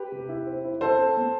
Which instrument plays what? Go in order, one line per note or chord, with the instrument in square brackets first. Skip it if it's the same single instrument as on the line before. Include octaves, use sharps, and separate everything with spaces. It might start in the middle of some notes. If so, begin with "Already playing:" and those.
Already playing: [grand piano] G4 B4
C3
E4
C4
E4
C4 A4 C5
C4
B3